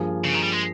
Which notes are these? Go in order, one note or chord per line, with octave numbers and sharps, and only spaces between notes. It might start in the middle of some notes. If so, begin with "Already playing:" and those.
Already playing: G2 F3 A#3 F4 G#4
C#3
D#3
G3
G#3